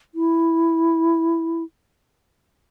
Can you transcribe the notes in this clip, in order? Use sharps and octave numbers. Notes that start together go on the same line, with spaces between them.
E4